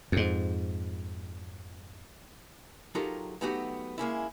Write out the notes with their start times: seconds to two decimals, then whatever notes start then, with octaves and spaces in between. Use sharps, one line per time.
0.12 F2 G#2
2.95 F#3 D#4 F4 G4 A4 A#4
3.41 F#3 A3 B3 D#4 F#4 G4
3.98 G#3 A#3 C#4 E4